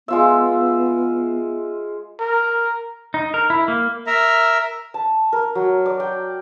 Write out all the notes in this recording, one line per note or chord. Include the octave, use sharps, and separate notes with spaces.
G#3 B3 F4 E5
A#4
D#4
A#4
E4
A#3
A#4 E5 A#5
A5
A#4
F#3
D5
G5